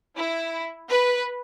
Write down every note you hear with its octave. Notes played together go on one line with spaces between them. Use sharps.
E4
B4